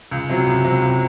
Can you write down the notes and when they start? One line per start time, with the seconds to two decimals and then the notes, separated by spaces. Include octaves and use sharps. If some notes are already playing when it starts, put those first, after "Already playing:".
0.11 C#2
0.29 C3 F#3
0.47 C#2
0.65 C3 F#3
0.82 C#2